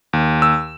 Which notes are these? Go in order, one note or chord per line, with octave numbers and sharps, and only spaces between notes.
D#2
E6